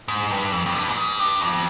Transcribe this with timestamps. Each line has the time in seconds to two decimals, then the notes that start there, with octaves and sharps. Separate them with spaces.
0.08 G#2
0.31 G2
0.52 F2
0.66 F2
0.74 G2
0.88 A#2
0.97 G#2
1.19 G2
1.41 F2